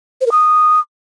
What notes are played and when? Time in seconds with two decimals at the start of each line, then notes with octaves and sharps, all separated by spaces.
0.21 C5
0.26 A#4
0.32 D#6